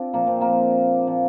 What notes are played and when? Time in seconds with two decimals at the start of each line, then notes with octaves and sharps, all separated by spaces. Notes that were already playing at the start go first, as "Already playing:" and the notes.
Already playing: C4 D4 F4
0.13 A#2 F3 A#3
0.27 C4
0.41 A#3
1.07 A#2 F3